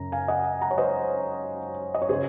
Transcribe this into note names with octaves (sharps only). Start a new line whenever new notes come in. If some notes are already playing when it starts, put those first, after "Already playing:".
Already playing: F#2 C#3 A#5
F5 G#5
D#5 F#5
F#5 A#5
C#5
C5 D#5
D#5
C#5
C#3 G#4 C5